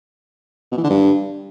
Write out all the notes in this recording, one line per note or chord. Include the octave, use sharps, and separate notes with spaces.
B2
E3
D3
G2